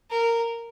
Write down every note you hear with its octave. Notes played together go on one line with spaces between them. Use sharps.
A#4